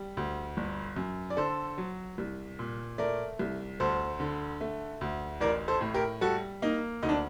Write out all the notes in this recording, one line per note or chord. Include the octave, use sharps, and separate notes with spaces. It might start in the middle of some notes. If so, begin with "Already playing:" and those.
Already playing: G3
D2
G1
F#2
D5
D3 A4 C5
F#3
C2
A#2
A3 A#4 D5
C2
D2 A4 C5
D3
A3
D2
A1 A#4 D5
A4 C5
A2
G4 A#4
G3 F#4 A4
A#3 D#4
D2 D#4
D4